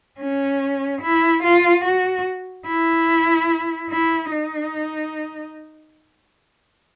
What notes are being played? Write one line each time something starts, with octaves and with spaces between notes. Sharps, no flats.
C#4
E4
F4
F#4
E4
E4
D#4